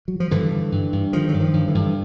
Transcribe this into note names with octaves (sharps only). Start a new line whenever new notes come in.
F#3
F3
G2 D3 E3
D3
G2
G2
D3 D#3 F3
F#3
G2
D#3 F3
G2
D3 E3
G2